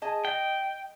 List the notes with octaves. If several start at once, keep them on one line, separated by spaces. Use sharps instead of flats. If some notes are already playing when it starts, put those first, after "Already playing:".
G#4 D#5 A5
D#5 G5